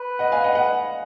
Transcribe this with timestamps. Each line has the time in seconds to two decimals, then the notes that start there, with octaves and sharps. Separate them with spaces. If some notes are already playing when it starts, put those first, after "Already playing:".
Already playing: B4
0.19 D#5 F#5
0.32 F5 G#5
0.44 D#5 F#5
0.55 D#5 F#5